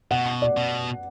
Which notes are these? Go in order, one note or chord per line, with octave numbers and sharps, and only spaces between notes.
B2 F#5
D5
B2